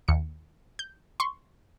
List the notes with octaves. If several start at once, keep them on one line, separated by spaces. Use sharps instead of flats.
D#2 C#7
G6
C6 C#6